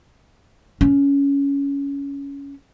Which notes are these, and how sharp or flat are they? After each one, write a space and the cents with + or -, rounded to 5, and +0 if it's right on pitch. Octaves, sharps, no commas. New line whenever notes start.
C#4 +15